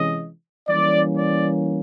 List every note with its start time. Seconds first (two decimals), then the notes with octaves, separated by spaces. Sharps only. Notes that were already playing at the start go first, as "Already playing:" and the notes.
Already playing: C3 E3 G#3 C#4 D#5
0.68 E3 G3 A#3 C#4 D5
1.15 D5